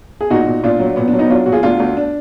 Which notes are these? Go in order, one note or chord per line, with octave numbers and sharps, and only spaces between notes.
G#4
A#2 D#4 F#4
A#2
A#2 D4 F4
F#3
A#2 B3
D4
F#3
B3 D#4
F#3 D4 F4
A#2 F#4
F4 G#4
D2 D4 F4
D2
D4